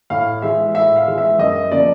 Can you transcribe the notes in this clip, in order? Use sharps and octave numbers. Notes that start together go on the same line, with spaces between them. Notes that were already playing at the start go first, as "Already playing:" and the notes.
A2 F5
E3 G#3 E5
A2 E5
F5
E3 G#3
E5
F#2 D#5
C#3 F3 A#3 D5